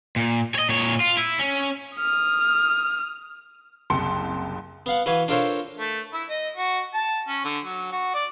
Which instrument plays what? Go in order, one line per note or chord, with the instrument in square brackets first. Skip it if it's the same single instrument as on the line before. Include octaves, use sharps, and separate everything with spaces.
[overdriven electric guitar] A#2
C#5 D#5
A#2 C#5
F4
E4
C#4
[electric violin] D#6 F6
[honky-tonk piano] F#1 C2 G5 A5 C6 C#7
[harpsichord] B3 F5 F#5
E3 F#4 B4 F5 G#5
D4 F4 A4 A#4 C5 C#5
[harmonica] A3
E4
D#5
F#4
A5
C#4
D3
F#3
F#4
D5